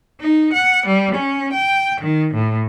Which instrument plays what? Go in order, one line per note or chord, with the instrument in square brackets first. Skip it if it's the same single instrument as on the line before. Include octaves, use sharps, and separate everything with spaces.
[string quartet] D#4
F#5
G3
C#4
G5
D#3
A2